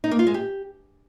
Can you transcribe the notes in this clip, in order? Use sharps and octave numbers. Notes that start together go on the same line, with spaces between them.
D#4
A#3
F4
G#3
G4